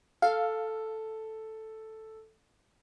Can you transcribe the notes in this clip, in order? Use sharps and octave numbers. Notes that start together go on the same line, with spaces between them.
A4 F5